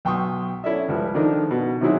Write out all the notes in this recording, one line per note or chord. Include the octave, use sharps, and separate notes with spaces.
B1 G5 C6 C#6 D#6
C#4 E4 A4 D5 E5
C#2 F3 G3
D#3 F3 D4 D#4 A4 A#4
B2
C3 D#3 F#3 D#4 E4 G#4